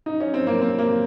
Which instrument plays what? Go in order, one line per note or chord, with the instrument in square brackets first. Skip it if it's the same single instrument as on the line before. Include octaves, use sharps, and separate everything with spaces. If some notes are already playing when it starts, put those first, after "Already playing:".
[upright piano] D#4
C#4
C4
A#3
C4
A#3